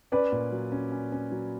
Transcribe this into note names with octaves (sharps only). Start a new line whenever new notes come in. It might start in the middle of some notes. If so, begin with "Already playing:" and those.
C#4 B4 D5
A#2
F#3
C#4
C#4
C#4
F#3